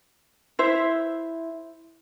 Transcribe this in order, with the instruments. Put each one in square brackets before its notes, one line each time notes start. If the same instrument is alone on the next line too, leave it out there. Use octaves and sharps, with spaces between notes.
[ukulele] E4 C5 E5